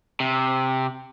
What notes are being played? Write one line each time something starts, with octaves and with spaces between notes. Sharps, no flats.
C3